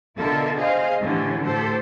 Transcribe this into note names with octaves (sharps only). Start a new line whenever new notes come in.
B2 D3 F4 A4 A#4 E5
G#4 C5 D#5 F5
A2 D3 E3 C#4 G4
A2 G4 A4 C5